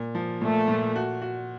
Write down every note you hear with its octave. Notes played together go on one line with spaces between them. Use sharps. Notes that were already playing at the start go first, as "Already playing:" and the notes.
Already playing: A#2
F3
A#2 A3
A#2
F#4
F#4